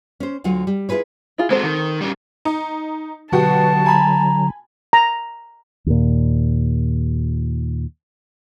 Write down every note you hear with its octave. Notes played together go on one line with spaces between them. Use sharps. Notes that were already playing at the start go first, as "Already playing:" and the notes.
C#4 C5
D2 D3 F#3 F4
G3
E4 F4 G#4 B4 C#5
E4 F4 G#4
G#3 C4 F#4 A4 C5
D#3
G3 C#4
D#4
B2 D3 F#3 F#4 G4 B4 A5
G#5 A#5 B5
A#5
D#2 A#2